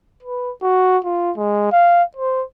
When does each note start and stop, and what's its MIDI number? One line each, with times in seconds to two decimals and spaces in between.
0.23 0.51 71
0.62 0.98 66
1.04 1.31 65
1.37 1.72 56
1.72 2.03 77
2.16 2.43 72